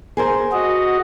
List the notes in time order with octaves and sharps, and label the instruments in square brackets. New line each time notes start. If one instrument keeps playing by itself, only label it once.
[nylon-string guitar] G#4 A#4 C5
[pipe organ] F#4 D#5